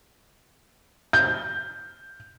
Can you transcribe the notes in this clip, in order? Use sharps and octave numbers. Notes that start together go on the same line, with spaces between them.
G6